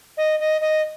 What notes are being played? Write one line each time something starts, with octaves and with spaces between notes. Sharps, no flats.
D#5
D#5
D#5